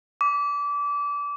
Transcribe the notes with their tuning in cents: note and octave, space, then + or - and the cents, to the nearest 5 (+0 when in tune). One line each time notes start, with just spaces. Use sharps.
D6 -25